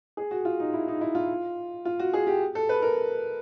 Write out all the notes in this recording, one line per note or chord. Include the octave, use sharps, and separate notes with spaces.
G#4
F#4
F4
D#4
E4
D#4
E4
F4
F4
F#4
G#4
G4
A4
B4
A#4